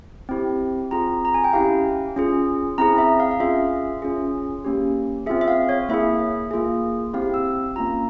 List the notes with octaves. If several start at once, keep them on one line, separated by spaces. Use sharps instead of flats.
C4 E4 G4
C4 F4 G#4 A#5
A#5
G#5
G5
C#4 E4 G4 F5
C#4 F4 G#4
C4 E4 G#4 A#5
E5
F5
F5
C#4 F4 G#4 E5
C#4 F4 G#4
A#3 C#4 G4
C4 F4 G#4 E5
E5
F5
C#5
A#3 E4 G#4 E5
A#3 F4 G#4
C4 E4 G4 F5
E6
A#3 C#4 F4 A#5